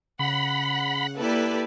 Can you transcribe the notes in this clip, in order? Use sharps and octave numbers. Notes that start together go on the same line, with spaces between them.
C#3 F#5 B5
A#3 E4 G4 A4 B4 D5